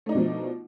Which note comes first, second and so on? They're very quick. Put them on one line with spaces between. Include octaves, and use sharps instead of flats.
A3 D#4 D4 B2 F3